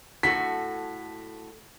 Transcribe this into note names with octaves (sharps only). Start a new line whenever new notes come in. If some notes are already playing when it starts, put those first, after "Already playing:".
A2 F#4 A4 B6